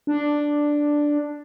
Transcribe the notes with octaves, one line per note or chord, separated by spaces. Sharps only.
D4